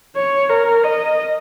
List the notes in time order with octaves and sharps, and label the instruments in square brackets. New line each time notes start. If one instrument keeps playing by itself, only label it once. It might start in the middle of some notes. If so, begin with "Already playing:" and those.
[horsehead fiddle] C#5
A#4
D#5